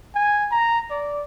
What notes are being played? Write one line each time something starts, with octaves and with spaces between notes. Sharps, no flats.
G#5
A#5
D5